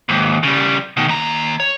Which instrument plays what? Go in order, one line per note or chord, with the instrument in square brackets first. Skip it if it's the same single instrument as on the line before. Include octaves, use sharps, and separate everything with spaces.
[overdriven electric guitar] D#2 G#2
C#3 G3
B2 D#3
D#2 A#5
C#5